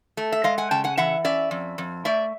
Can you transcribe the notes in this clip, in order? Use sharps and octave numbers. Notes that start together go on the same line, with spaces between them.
A3
E5
G#3 D#5 F5
F#5 G#5
C#3 G5 A5
F#5 G#5
E3 E5 F#5
C#4 D5 E5
F2
F2
A3 D5 E5